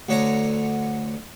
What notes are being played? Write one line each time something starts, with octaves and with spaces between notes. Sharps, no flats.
D2 D3 C#5 A#5